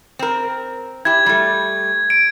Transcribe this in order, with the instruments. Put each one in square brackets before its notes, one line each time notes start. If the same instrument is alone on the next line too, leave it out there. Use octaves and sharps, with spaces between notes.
[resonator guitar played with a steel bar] C4 A#4
[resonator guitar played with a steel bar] E4 G4 [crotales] G#6
[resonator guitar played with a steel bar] G3 A3
[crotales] D7